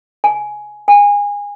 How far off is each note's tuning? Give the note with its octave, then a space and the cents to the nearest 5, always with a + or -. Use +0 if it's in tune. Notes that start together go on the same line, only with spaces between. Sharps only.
G#5 +10
G#5 -25